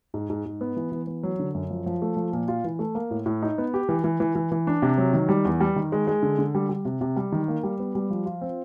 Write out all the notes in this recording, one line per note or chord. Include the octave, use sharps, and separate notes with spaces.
G#2
G#2
G#2
B3
E3
E3
B3
F#3
D3
F#2
F3
F3
A3
F3
A#2
F4
E3
A3
A#3
A2
A2
D#4
B3
G4
E3
E3
E3
E3
E3
D4
C3
F#3
D#3
G3
E2
G3
D#3
G#3
G#3
D3
D3
G3
G3
C3
C3
G3
D#3
A#3
G3
B3
G3
F3
F4
C4